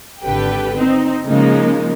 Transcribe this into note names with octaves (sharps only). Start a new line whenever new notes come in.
G#1 D3 G4 A4 B4 G5
C4 D#4
C#3 F3 G#3 A#3 D#4